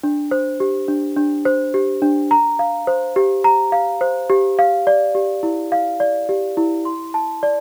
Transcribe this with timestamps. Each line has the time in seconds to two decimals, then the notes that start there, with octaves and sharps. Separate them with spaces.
0.03 D4
0.31 C5
0.60 G4
0.88 D4
1.17 D4
1.45 C5
1.74 G4
2.02 D4
2.31 A#5
2.59 F5
2.87 C5
3.16 G4
3.44 A#5
3.72 F5
4.01 C5
4.30 G4
4.59 F5
4.87 D5
5.15 G4
5.43 E4
5.72 F5
6.00 D5
6.29 G4
6.57 E4
6.85 C6
7.14 A5
7.43 D5